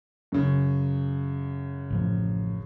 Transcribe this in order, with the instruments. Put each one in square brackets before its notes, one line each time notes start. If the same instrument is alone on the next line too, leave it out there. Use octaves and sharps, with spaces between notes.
[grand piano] F#2 C#3
[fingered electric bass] A1 A2 F3